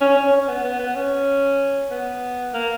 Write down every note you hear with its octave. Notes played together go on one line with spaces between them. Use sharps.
C#4
C#4
C#4
B3
B3
B3
C#4
B3
A#3